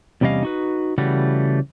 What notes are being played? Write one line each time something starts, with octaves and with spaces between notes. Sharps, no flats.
E2 C3 G3 C#4 D#5 F5
D#4 F#4 B4
C#3 E3 G3 A3 F#4